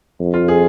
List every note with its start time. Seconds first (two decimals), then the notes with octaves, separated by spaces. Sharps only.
0.20 F2
0.34 F4
0.48 G#4